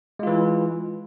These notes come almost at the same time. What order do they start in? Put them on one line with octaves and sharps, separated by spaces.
G#3 F4 E3